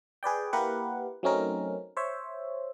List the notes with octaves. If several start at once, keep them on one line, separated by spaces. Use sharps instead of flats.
G#4 B4 D5 G5
A#3 E4 G4 A#4 B4 F#5
F#3 A3 C4 C#4 D#4 A#4
C5 C#5 E5